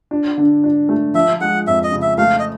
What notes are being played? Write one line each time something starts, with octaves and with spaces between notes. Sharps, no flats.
D4
D3
D4
A3
F3 E5
G#3 F#5
F2 E5
D#5
C#3
E5
A3 F5
D#5